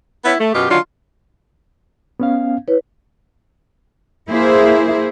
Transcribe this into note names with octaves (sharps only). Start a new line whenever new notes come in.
B3 C#4 E4
A3
F#2 B2 F4 G4
D3 D#3 F#3 D4 F4
B3 C#4 F5
E4 B4 C#5
A#3 E4 G#4 C5